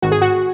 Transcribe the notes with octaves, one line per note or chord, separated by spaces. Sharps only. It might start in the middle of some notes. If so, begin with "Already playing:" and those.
G#1 F#4
G#4
F#4